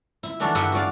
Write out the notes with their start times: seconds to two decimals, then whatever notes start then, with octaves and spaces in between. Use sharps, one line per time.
0.23 E4
0.40 D#3 E3 D4 F#4 A4
0.55 G2 E4 E5 F#5 G5
0.72 F#4 G#4 D5 F5